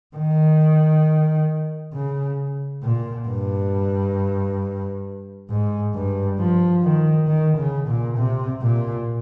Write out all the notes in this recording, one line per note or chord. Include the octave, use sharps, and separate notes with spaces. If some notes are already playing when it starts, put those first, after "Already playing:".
D#3
C#3
A#2
G2
G#2
G2
F3
D#3
D#3
C#3
A#2
C3
A#2